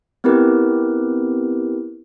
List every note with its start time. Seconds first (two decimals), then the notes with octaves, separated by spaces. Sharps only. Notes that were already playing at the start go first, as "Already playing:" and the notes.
0.24 B3 C4 E4 G4 A#4 B4